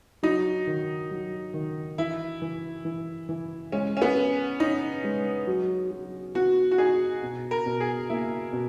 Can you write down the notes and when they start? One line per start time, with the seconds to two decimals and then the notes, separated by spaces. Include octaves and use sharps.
0.23 F#3 D#4
0.67 D#3
1.11 F#3
1.54 D#3
1.98 E3 E4
2.42 E3
2.85 E3
3.29 E3
3.72 G#3 C#4
3.97 C#4
4.02 B3
4.16 C#4
4.60 C#4 D#4
5.04 G#3
5.47 F#3
5.91 F#3
6.35 B3 F#4
6.71 F#4
6.78 D#4 G#4
7.23 B2
7.51 A#4
7.66 B2
7.80 G#4
8.09 A#3 E4
8.53 B2